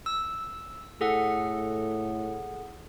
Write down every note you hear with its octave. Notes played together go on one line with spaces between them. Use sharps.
E6
A2 G#4 A4 F#5